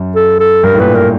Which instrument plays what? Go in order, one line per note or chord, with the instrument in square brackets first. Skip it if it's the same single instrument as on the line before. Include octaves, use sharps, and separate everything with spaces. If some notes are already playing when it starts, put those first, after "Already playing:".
Already playing: [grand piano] F#2
[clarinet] A4
A4
[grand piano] G2 [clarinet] A#4
[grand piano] A2
[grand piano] A#2 [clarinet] B4
[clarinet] A#4